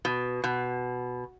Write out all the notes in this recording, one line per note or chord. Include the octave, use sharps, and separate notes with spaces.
B2
B2